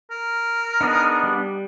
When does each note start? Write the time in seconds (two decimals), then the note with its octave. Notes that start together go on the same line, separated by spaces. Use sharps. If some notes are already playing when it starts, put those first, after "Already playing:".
0.11 A#4
0.81 B3 D4 D#4 G#4
1.23 G3